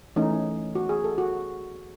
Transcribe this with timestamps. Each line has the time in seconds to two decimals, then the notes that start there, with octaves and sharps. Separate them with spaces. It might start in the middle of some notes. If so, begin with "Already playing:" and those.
0.16 E3 A3 C#4 D#4
0.75 F#4
0.89 G#4
1.04 A4
1.18 F#4